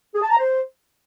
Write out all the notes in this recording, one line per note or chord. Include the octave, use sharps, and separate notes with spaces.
G#4
A5
A#5
C5